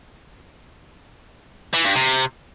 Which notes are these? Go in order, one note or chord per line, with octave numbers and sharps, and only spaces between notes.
E3
G2
C3